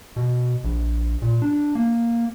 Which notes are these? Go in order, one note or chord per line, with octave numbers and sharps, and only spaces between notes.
B2
A#1
A#2
D4
A#3